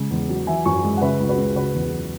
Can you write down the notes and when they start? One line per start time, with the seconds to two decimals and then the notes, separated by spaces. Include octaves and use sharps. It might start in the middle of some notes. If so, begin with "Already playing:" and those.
Already playing: C#3 G#3
0.11 E2
0.29 F#3
0.47 E3 E5 G#5
0.65 F#2 G#5 C#6
0.84 G#3
0.97 F#5
1.01 C#3 B4 E5
1.20 C#2
1.29 F#4 B4
1.38 G#3
1.56 C#3 F#4 B4
1.74 E2
1.93 F#3